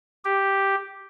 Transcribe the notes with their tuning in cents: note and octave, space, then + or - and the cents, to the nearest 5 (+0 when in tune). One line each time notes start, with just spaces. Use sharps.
G4 +0